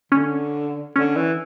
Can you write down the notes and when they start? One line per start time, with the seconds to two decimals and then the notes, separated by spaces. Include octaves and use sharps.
0.12 D3 C#4
0.96 D3 C#4
1.16 E3